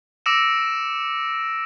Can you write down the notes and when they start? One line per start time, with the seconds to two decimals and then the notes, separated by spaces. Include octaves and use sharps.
0.26 D6 E6 A#6 C#7 D7 E7